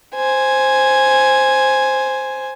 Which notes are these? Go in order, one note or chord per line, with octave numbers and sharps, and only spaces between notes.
C5 G#5